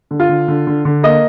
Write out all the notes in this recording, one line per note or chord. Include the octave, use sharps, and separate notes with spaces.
D3
F4
D3
D3
D3
D3
A#3 D#5